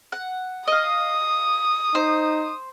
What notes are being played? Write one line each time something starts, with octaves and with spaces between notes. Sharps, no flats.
F#5
D#5 F5 D#6
D#4 C5